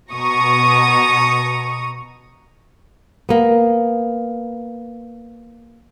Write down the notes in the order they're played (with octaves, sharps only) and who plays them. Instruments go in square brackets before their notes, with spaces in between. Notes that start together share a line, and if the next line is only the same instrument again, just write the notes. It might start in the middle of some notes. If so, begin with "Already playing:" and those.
[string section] B2 A#5 C#6 D#6
[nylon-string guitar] A#3 B3